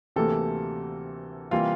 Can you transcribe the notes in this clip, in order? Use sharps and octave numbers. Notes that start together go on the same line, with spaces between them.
D2 C3 E3 A#3 A4
C3 E3 G3 A#3 F4 F5